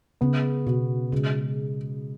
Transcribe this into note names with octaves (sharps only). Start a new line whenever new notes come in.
C#3 B3
B2 F#4
C#3 G#3